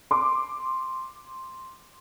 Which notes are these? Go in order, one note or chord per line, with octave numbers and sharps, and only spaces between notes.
C6 D6